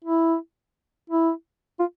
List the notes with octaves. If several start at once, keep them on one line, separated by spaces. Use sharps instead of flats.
E4
E4
F4